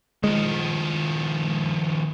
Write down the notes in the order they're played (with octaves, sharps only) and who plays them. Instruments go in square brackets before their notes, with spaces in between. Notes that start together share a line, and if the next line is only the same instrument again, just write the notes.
[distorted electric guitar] D#3 F3 [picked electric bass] G#3